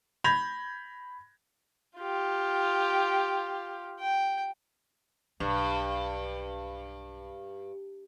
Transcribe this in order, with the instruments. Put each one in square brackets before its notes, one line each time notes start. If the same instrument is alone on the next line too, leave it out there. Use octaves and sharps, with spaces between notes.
[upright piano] B5 G6 G#6 A#6 F7
[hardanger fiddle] F4 G4
G5
[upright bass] B1 [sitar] G2